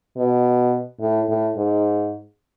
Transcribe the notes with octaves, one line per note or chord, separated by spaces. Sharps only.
B2
A2
A2
G#2